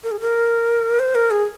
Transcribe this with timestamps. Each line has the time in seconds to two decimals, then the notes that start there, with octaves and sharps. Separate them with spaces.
0.04 A#4
0.11 G#4
0.20 A#4
0.99 C5
1.15 A#4
1.31 G#4